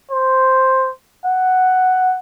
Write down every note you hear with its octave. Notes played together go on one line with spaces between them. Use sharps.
C5
F#5